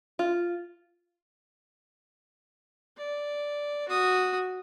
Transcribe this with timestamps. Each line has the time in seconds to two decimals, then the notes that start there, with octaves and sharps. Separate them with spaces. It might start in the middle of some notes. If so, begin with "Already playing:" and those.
0.19 F4
2.97 D5
3.88 F#4 D#6